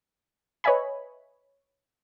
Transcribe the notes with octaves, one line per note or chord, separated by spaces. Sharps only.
B4 C#5 D#5 E5 G#5 B5